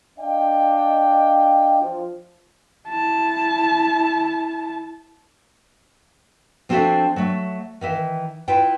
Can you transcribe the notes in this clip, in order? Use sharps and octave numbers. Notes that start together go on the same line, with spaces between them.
D4 D#5 F5 G5
F3
E4 A5
F3 C4 D4 F#4 A4 E5
F#3 A3
D#3 E3 E5
E4 F4 B4 G5